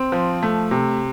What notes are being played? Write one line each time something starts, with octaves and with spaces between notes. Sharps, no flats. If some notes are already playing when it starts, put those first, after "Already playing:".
Already playing: C4
F3
A3
C3